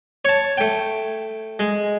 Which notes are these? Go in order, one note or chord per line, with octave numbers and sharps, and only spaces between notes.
C#5 A5
A3 G5
G#3